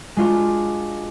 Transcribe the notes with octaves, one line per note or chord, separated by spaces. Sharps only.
G#3 D4 F4 F#4